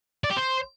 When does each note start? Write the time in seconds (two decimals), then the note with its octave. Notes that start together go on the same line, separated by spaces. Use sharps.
0.24 D5
0.30 G4
0.37 C5